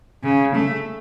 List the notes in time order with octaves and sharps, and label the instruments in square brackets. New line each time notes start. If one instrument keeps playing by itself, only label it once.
[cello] C#3
A3